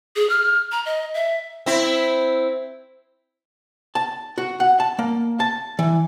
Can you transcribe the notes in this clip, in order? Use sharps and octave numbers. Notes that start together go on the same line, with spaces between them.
G#4
F6
A#5
D#5
E5
C4 E4
A5
F#4
F#5
A5
A#3
A5
E3